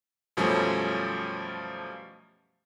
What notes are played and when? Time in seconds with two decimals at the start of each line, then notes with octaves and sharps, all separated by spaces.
0.37 F#2 B2 F3 G3 A3 C#4